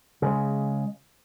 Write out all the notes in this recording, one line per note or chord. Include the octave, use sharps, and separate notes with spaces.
C#3 G#3